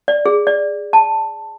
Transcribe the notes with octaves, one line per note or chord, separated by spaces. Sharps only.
D5
G#4
D5
A5